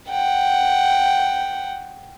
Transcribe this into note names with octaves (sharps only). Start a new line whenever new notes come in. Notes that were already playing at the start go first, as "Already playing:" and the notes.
F#5 G5